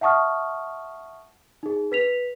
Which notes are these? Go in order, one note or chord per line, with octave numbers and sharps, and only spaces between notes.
E5 F#5 A5 C#6 D#6 F6
D#4 G#4
B4 B6 F7